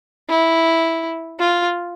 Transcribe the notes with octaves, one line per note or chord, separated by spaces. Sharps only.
E4
F4